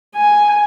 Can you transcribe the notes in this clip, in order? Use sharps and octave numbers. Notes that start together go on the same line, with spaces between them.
G#5